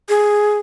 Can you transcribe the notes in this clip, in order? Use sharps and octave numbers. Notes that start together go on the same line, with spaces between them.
G#4